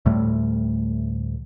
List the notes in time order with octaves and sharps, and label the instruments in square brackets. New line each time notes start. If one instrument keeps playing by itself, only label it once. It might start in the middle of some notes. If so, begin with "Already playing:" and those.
[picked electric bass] D2 A2 G3 A3